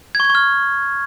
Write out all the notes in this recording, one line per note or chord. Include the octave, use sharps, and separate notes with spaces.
G#6
C#6
G#6
C#6
F6